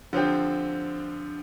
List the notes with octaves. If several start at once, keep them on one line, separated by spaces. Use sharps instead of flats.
D3 F3 C4 G4